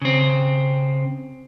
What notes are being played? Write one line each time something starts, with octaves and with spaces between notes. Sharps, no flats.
C#3 C4